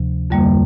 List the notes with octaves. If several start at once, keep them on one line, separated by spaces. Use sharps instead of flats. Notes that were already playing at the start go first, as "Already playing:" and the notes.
Already playing: D2 C3 F3
F2 D3 G3 A#3